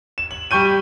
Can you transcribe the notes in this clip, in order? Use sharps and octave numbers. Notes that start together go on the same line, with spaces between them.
E7
F#7
G3 G5 C#6 G6 D#7